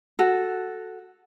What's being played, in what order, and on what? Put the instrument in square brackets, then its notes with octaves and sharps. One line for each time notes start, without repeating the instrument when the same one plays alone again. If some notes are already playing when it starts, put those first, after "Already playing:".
[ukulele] F#4 A4